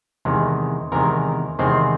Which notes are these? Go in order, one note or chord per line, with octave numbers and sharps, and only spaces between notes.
E2 C3 D#3 G#3
E2 C3 D#3 G#3 A#4
E2 C3 D#3 G#3 C4 C5